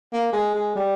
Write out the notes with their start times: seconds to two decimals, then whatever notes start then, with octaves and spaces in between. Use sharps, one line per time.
0.13 A#3
0.33 G#3
0.54 G#3
0.76 G3